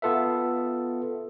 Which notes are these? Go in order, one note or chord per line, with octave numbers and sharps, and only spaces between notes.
B3 F4 A4 B4 E5